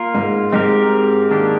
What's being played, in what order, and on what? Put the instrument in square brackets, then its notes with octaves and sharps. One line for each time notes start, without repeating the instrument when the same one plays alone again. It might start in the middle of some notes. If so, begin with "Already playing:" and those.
Already playing: [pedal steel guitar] A#3 F4 A#4
[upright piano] G#2 G#3
[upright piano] G#2 G#3 [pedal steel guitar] C4 G4 A#4
[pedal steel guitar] D#3 A#3 D4 G4